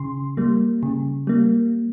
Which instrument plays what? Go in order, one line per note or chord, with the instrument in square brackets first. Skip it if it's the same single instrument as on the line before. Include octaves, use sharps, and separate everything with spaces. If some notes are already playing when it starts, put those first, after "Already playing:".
Already playing: [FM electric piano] C#3 C6
G3 A#3
C#3
G3 A#3